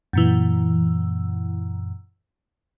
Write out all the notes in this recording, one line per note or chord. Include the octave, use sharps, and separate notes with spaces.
F#2 A#2 E3